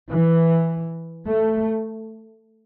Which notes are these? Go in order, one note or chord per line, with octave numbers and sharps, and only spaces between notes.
E3
A3